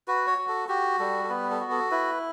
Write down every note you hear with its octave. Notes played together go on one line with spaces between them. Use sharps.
F#4 B4
C#5
F#4
A4
F#4 G4
G3 A4
A4
B3 B4
A4
F#4
A4
E4 B4